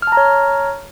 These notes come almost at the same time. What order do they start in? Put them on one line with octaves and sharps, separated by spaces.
F6 A5 A#5 C#5